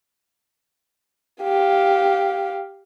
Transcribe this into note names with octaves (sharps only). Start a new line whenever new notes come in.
G4 F5